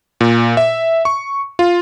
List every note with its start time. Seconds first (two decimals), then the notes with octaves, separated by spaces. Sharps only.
0.21 A#2
0.57 E5
1.05 C#6
1.59 F4